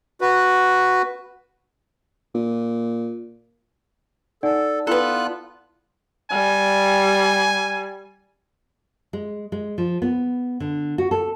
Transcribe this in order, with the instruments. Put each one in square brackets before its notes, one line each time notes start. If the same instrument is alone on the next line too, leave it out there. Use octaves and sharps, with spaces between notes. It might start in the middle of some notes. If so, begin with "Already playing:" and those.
[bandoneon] F#4 B4
[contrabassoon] A#2
[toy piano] D#4 F#5 G#5 [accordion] A4 [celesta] D5
[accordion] B3 F4 F#6 [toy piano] E4 G5 [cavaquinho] A4 B4
[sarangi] G3 [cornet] G#5
[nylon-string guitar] G#3
G#3
F3
B3
D3
F#4
A4